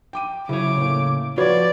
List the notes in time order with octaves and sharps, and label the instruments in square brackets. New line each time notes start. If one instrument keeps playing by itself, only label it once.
[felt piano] G5 D6 D#7
[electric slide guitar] C#3 C#5 [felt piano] F#3 E4 [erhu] D6
[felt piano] A2 A#3
[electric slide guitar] F3 F4 [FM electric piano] F#4 B4 C#5 [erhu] D5 [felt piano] G#6